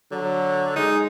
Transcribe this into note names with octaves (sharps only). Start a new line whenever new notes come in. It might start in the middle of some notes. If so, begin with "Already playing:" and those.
D3 F#3
G#3 D#4